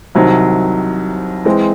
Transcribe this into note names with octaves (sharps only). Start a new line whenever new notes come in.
C2 C3 D#3 F#3
E3 G#3 C4